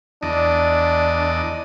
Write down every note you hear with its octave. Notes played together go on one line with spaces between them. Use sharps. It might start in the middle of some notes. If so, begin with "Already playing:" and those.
E2 D4 D5 D#5